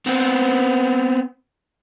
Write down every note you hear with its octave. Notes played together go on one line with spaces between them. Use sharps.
B3 C4